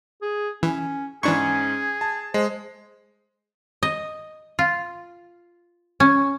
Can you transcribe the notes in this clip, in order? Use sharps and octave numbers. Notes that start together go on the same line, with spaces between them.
G#4
E3 C#4
G#2 E3 C#4 D4 G#4 C#6
A5
G#3 C5
D#5
F4
C#4